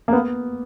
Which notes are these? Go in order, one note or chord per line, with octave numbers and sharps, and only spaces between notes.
A#3
B3